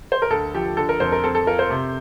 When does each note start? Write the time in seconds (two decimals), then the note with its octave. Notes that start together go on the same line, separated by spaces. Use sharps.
0.12 C5
0.22 A#4
0.30 D2 A4
0.55 F3 G4
0.77 D3 A4
0.89 A#4
1.00 F2 C5
1.12 A#4
1.24 C4 A4
1.35 A4
1.47 F4 A#4
1.59 C5
1.70 C3